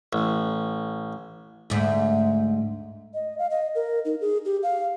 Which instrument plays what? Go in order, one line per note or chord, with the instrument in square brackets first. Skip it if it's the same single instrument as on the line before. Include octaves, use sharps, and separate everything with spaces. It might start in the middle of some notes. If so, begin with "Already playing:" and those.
[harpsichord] A1
[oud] D2 G#2
[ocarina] D#5
F5
D#5
A#4
D#4
G#4
G4
F5